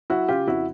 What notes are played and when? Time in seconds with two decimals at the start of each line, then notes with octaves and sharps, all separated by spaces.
0.10 F#3 E4 F#4
0.29 C#3 F4 G4
0.48 F2 E4 F#4